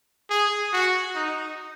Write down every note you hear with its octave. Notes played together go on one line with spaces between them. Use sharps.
G#4
F#4
D#4